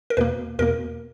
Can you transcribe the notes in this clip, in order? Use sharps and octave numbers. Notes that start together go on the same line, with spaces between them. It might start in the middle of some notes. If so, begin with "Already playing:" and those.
A#4
E2 B2 A#3 B4
E2 B2 A#3 A#4